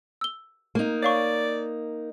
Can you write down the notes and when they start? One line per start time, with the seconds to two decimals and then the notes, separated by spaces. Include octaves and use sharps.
0.21 E6 G7
0.75 A#3 D#4
1.03 C#5 D5 F5 C#6